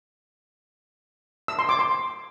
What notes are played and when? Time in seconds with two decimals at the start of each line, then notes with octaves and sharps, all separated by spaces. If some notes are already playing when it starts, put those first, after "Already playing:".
1.48 E6
1.59 C6
1.69 D6
1.79 C6